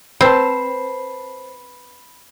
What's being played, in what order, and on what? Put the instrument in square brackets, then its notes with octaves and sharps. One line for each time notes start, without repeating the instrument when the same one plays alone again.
[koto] C4 [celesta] B4 [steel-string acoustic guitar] C5 A5 [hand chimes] B5 C7